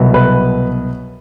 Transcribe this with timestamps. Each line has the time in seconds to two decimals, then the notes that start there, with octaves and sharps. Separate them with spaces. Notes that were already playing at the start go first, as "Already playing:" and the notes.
Already playing: C2 B2 F#3 B3
0.14 B4